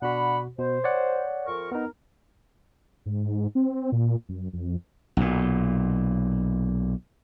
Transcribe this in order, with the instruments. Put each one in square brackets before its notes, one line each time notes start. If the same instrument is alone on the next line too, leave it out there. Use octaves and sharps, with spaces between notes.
[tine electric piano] B2 F#4 [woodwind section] D4 F#5 B5
[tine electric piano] B2 [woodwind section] C5
[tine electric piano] C#5 D5 F#5
[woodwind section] F2 A#4 C#6
[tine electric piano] B3 D#4 [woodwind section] A#4
[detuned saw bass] G#2
C4
A#2
F#2
F2
[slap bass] B1 A#2